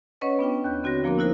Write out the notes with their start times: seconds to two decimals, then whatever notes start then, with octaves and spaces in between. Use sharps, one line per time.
0.21 C#4 B4 C#5 D#5 F#5
0.39 B3 D4 F4 G5
0.64 D#2 F#6 G6
0.83 D3 C4 F#4 C#5 A#6
1.04 F3 A#3 B3 D4 A#4
1.18 D#4 E4 F#4 A#4 C5